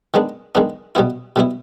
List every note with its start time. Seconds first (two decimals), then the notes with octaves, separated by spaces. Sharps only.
0.14 D#3 G#3 B3 D4
0.55 D#3 G#3 B3 D4
0.95 B2 G3 B3 E4
1.36 B2 G3 B3 E4